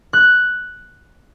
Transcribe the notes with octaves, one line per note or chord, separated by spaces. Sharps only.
F#6